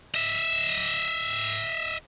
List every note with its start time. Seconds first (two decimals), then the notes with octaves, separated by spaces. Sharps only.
0.14 D#5 E5